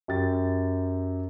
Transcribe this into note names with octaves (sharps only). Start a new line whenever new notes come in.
F#2 G4 A6